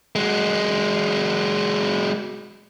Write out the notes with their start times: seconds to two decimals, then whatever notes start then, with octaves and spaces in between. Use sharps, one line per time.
0.16 F#3 G#3